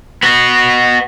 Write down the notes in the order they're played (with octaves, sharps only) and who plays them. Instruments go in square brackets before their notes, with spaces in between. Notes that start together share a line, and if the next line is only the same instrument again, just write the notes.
[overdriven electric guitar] B3 F#4